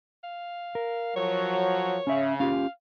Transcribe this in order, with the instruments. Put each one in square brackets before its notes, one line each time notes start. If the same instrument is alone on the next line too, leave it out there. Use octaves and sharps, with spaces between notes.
[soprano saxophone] F5
[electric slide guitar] A#4
[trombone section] F3 F#3 [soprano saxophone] C#5
[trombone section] C#3 [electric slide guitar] C#4 E5
[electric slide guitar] C#4 F4 G4 [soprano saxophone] F5